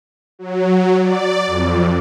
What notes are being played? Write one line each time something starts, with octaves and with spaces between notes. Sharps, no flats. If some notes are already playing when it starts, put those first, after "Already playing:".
F#3
D5
F2